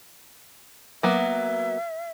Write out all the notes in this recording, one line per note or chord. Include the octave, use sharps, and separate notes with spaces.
F#3 A#3 B3 E5